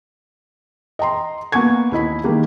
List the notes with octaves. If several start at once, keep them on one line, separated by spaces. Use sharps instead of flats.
D#5 G5 A#5 C6
A#3 B3 G#5 C#6 G#6
D#2 E4 D#5 B5
D#3 G#3 A#3 G4